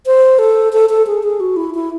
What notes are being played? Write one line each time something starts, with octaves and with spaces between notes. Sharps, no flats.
C5
A4
A4
A4
G#4
G#4
F#4
E4
E4